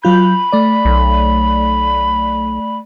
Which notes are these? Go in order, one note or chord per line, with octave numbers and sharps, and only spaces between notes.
F#3 F4 B5 G6
A3 D5
B1